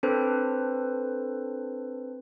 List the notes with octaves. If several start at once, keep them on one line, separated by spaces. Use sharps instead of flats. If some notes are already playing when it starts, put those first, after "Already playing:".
C4 D4 A4 B4 C5